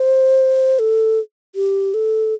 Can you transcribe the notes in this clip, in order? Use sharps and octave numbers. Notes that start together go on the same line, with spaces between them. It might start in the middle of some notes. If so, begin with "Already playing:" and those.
Already playing: C5
A4
G4
A4